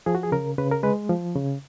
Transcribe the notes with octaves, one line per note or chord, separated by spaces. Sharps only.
F3 G#4
F#4
G#4
C#3 A#4
C#3 B4
A#4
G#3 B4
F3
C#3